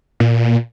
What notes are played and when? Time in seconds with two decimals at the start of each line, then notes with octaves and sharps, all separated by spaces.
0.20 A#2